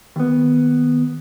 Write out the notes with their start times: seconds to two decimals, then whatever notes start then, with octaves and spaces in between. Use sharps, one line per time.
0.16 D#2 B3